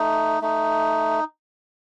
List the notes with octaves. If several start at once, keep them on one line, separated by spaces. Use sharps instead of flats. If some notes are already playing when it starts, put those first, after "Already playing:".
Already playing: A3 D#4
A3 D#4